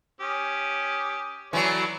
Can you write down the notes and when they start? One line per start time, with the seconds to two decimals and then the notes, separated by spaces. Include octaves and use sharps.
0.21 C#4 G4 D#6
1.53 E3 F#3 A3 D5